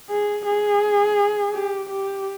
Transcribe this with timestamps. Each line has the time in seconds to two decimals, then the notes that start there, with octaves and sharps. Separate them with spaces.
0.10 G#4
0.46 G#4
1.53 G4
1.89 G4